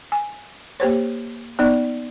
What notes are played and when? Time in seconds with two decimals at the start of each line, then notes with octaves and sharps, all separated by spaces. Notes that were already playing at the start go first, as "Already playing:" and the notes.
0.12 G#5
0.80 A#3 G4 C5 C#5
1.59 B3 D#4 D5